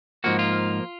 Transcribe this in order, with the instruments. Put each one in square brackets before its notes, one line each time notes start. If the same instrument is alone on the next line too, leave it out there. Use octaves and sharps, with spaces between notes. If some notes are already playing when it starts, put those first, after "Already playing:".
[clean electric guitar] G#2 F3 A#3 F#4
F4